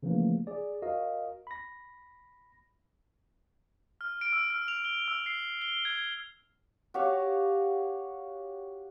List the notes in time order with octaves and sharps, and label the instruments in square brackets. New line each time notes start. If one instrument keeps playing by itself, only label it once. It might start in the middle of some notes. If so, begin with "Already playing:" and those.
[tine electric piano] C#3 E3 F3 A3 A#3
G#4 D5
F#4 A#4 D#5 F5
B5 A#6
[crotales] F6
D7
E6
F6
F7
G7
E6
C7
G7
G#6
[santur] F#4 G4 C#5 F5